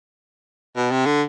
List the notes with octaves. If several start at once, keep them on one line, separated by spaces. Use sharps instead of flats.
B2
C3
D3